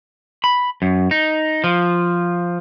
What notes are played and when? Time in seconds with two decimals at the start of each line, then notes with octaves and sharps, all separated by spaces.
0.44 B5
0.82 F#2
1.11 D#4
1.64 F3